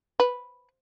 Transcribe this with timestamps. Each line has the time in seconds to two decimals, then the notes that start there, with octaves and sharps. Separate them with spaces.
0.20 B4